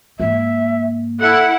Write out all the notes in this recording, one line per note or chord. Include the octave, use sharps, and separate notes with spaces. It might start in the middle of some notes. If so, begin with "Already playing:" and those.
G#2 A#3 E5
E4 A4 F#5